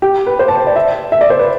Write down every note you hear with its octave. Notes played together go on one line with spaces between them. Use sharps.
G4
B4
C5
A5
D5
E5
E5
D5
C5
B4